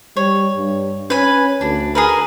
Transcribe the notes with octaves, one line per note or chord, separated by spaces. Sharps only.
G3 C#5
G2
C#4 B4 G#5
D2 D4
G#4 A#4 B4